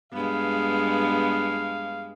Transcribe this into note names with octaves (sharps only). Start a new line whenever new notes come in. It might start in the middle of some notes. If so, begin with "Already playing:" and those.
G2 G#3 B3 F5